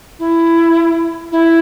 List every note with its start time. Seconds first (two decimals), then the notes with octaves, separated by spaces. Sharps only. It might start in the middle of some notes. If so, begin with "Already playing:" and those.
0.19 E4
1.31 E4